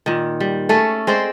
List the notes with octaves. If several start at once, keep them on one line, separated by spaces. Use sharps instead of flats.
A#2 D#3
G3
A3 C#4 A4
G#3 C4 C5 D5